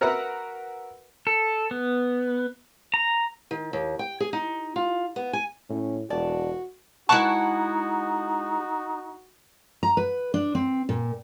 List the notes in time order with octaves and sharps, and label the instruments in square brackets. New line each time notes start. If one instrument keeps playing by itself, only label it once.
[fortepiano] F#4 A#4 B4 E5 F#5
[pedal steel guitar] A4
B3
A#5
[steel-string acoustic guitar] D#3
D#2
G5
G#4
D#4
F4
B3
G#5
[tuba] A2 [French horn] C#4
[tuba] E1 [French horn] F#4 [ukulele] D5 A5
[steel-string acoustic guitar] G#3 E4 F#5 [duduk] D#4 [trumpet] F#4 [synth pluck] A5 C#6 F#6
[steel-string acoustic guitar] A#5
B4
D4
C4
A#2